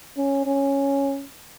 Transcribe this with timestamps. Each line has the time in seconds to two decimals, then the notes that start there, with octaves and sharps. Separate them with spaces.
0.17 C#4
0.46 C#4